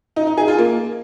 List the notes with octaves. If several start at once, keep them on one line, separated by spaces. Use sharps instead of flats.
D#4
D#4
G#4
F4
A#3